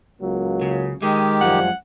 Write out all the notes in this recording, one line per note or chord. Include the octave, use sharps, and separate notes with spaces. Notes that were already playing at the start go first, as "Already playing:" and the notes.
C#2 F#3 A#3
C#3
D#3 G#3 G4
F#2 F3 G3 G#3 F#5